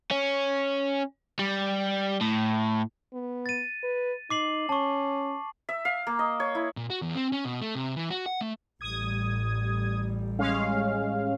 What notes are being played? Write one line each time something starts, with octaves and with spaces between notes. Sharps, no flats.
C#4
G3
A2
B3
A6 D#7
B4
D#4 D6 C7 F#7
C#4 A5 C#6
E5
F5
A#3
D#5
C#5
E4
A#2
F#4
E2
C4
C#4
B2
A3
C3
E3
F#4
F#5
A3
A1 G3 D#6 G#6
G#3 C#4 F5